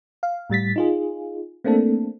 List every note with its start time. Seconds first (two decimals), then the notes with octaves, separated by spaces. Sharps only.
0.23 F5
0.50 A2 G3 A6 B6
0.76 D#4 F4 G#4
1.64 A3 A#3 C4 D4 A4